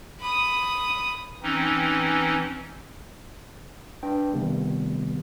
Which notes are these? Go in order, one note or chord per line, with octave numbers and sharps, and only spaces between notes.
B5 D#6
E3 C4 C#4 D#4
D4 B4 G5
C3 D#3 G3 A3 B3